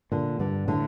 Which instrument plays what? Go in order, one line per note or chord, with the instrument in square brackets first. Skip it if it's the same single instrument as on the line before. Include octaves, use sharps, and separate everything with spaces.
[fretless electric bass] A#2 [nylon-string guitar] D3
[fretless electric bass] G2 [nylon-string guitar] D3
[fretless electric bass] A2 [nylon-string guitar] D3